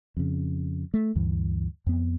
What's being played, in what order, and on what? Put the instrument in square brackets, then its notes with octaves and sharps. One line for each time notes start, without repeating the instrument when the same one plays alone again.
[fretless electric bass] F2 C#3
A3
D2 G2 E3
F2 B3